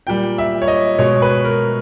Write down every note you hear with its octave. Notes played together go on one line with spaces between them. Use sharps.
A#2 G3 G5
E5
C#5
D#5
B2 G#3 C#5
B4
A#4